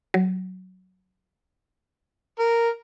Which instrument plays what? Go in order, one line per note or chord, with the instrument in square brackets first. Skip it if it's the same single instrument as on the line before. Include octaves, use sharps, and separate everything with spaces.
[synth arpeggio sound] F#3
[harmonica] A#4